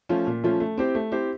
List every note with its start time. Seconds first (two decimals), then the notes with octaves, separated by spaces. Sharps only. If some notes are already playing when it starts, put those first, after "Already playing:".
0.09 F3 A3 C#4 F4
0.27 A#2
0.44 F3 A3 C#4 F4
0.60 A3
0.78 C4 E4 G4 C5
0.95 A3
1.12 C4 E4 G4 C5